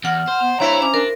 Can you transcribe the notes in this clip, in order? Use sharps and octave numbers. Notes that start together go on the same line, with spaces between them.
E2 F#5 F6
C5
B3
G2 C4 E4 C#5 A#5
C#4 D6
D4 A#4